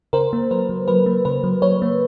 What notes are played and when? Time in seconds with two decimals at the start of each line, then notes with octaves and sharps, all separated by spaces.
0.13 C#3 A#4 C5
0.33 A#3
0.51 F#3 B4
0.69 F#3
0.88 F#3 B4
1.06 A#3
1.25 C#3 B4
1.44 F#3
1.62 F#3 B4 C#5
1.82 A#3